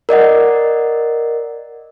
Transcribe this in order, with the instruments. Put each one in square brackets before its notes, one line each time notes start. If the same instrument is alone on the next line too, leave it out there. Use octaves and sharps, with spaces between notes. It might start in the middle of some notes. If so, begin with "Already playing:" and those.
[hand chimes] A#4 D5 D#5 F#5